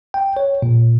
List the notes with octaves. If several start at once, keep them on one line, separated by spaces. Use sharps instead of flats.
G5
C#5
A#2